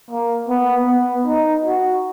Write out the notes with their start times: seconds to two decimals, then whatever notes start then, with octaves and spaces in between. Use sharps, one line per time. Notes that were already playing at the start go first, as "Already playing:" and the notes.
0.11 A#3
0.49 B3
0.88 B3
1.27 D#4
1.65 F#4